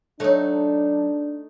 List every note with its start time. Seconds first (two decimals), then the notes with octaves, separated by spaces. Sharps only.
0.20 F#3 A3 D4 D#4 C#5